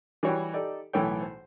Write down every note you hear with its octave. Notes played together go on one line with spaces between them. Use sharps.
E3 G3 F#4 C#5 F#5 G5
D#4 G4 A4 D5
B1 A2 E3 A4 C#5 G5
C5